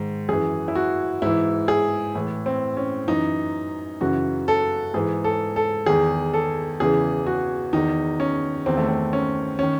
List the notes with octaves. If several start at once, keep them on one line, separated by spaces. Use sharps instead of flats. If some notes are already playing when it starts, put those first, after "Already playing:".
Already playing: G#2 D#3
F#2 E3 G#4
E4
F#4
G#2 E3 E4
G#4
A2 E3
C4
C#4
F#2 E3 D#4
F#2 C#3 E3 F#4
A4
G#2 E3 G#4
A4
A4
E2 D#3 G#4
A4
E2 C#3 E3 G#4
F#4
E2 D#3 D#4
C#4
E2 D#3 C4
A3
C4
C#4
D#3 C#4